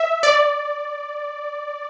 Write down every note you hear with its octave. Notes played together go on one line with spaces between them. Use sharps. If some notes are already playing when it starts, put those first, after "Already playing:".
Already playing: E5
D5